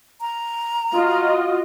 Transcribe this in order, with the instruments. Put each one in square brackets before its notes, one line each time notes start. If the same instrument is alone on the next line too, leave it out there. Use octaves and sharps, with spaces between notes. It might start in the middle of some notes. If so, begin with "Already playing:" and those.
[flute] A#5
[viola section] F4 F#4 D#5